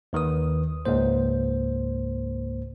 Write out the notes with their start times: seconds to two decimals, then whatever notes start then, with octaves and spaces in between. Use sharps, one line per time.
0.13 D#2 D#3 B4 D#6
0.85 C#2 G#2 A#3 C5